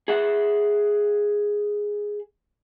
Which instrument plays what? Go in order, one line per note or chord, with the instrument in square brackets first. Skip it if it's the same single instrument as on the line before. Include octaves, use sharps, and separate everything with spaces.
[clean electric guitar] G#4 E5 F#5